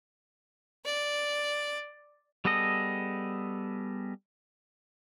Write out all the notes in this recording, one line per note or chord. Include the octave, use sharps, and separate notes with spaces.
D5
G3 B3 G#4 A4 D#5